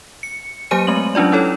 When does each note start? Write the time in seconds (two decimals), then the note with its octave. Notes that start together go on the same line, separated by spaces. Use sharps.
0.23 C#7
0.71 F#3 A#3 G4 C5 G#5 D#7
0.87 G#3 A3 C4 F#7
1.15 F#3 C#4 D4 F4 D5
1.32 C#4 E4 A4 C#5